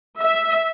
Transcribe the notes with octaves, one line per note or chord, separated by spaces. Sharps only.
E5